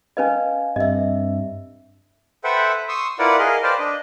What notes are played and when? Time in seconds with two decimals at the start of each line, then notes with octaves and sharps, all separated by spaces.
0.17 C#4 B4 D#5 F5 G#5
0.76 G2 C4 D#5 E5
2.44 A4 B4 C5 E5 F#5 G5
2.89 C6 C#6 D#6 E6
3.19 E4 F4 A#4 B4 D5 F#5
3.39 G#4 A#4 D#5 F5
3.63 B4 C5 D5 F5 G5 A5
3.79 D4 D#5